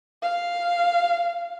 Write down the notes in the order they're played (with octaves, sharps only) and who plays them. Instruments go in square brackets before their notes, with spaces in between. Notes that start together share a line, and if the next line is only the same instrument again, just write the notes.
[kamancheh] F5